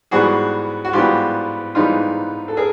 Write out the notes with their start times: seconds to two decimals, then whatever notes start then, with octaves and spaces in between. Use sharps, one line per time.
0.11 G#2 E3 G3 B3 F#4 G#4
0.85 F#4
0.93 G#2 E3 G3 B3 F4 G4
1.75 G#2 E3 G3 B3 D#4 F4
2.48 A4
2.57 G#4 A#4